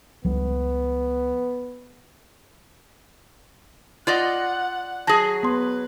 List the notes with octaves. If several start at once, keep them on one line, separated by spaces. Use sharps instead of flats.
C#2 F3 G3 B3
F4 D5 D#5 F#5
F#3 G#4 A5 A#6
B3 B4 C6